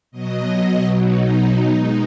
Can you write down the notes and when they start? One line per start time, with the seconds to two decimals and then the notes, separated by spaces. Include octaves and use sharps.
0.11 B2 F#3 D#5
0.93 D#4
1.75 B2 G#3